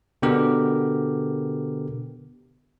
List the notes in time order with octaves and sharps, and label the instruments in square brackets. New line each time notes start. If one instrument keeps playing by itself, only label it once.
[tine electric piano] B2 D3 B3 G4 A#4